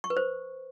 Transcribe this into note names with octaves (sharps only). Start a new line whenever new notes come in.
C#6
B4
C5